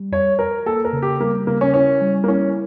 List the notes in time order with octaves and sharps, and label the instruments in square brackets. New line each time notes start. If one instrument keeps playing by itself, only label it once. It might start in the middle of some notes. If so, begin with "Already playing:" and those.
Already playing: [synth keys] G3
[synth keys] F2 [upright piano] C#5
[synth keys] F2 [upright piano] A#4
[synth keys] A#3 [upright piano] A4
[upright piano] A#4
[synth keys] C#3
[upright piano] G4
[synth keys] G3 [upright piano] A#3
[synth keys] C#3 [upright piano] A#3
[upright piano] C#4
[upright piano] C#4 [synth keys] E4
[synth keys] G3
[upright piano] A#3
[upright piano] C#4 [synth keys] E4